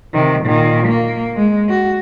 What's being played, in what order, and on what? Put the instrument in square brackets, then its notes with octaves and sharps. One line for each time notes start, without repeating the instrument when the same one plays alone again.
[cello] C3 D#3
A#2 D#3
A#3
G#3
F#4